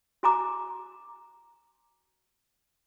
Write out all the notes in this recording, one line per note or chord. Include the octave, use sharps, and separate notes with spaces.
F#4 G#5 A#5 D6